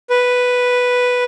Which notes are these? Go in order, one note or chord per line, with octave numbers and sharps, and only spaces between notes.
B4